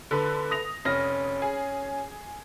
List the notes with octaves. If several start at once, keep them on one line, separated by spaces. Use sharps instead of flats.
D3 A4 B4
D#6 A#6 F7
F1 C#4 F6 A#6
G#4